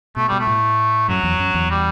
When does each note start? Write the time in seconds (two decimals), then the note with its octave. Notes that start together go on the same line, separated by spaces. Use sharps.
0.16 B2 A3
0.29 B2 G3
0.39 A3
0.47 A2
1.09 F#2 F#3
1.24 E2
1.39 F#2
1.54 E2
1.70 G3